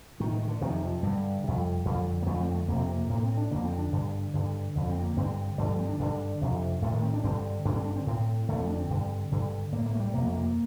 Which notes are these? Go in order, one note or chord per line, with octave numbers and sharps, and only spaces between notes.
A2 D#3
D#3
D3
F2 C3 D#3
F3
G2 D3 G3
F2 C3
F2 D3
A#3
F2 D3 A3
C4
A3
F2 C3 A#3
C4
A#3
A2 A#3
C4
D4
F2 D3 A#3
C4
D4
G2 D3
G2 D3
F2 D3
C4
A#3
G2 D3 C4
G2 D3 A3
F3
C4
D4
G2 D3
F2 C3
A2 A3
D#3
C4
D4
G2 D3 C4
G2 D3 D4
C4
D4
C4
A2 C4
F2 D3 A3
C4
D4
C4
G2 D3
G2 D3
A2 A#3
A#3
A3
G3
F2 C3 A#3
A3
A#3